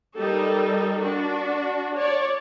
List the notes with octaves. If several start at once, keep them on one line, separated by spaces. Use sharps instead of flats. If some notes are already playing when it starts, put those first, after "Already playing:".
G3 D#4 A4 A#4
D4 F#4
C#5 D5